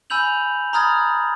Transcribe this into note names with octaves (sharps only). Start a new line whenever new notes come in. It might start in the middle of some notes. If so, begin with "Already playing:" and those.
G#5 B5 E6 G6 F7 F#7
A#5 B5 D#6 F6 G#6 A6